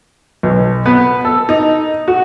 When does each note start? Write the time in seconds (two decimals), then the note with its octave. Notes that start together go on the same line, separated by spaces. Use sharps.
0.43 B1
0.86 B3
1.25 A4
1.49 D#4
2.08 F#4